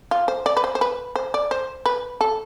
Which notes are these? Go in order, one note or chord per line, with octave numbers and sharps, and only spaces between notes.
F4
C5
D5
B4
C5
C5
B4
C5
D5
C5
B4
A4